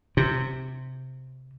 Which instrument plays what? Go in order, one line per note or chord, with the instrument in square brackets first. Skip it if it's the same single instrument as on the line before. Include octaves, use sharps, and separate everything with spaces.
[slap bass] C3